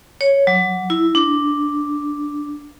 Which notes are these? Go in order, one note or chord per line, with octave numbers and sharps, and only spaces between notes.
C#5
F#3
E4
D4